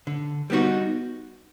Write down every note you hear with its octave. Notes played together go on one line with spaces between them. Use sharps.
D3
G3 B3 D#4 F#4